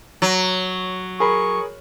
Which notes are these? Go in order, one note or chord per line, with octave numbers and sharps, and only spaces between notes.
F#3
G#4 A#4 B5 C#6